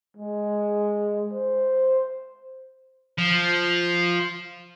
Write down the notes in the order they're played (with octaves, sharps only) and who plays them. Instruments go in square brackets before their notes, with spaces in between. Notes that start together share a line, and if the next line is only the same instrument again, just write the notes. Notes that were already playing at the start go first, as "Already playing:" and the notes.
[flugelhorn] G#3
C5
[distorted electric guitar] F3